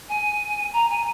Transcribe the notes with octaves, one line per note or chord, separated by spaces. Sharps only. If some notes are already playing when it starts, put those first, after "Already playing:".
G#5
A#5
G#5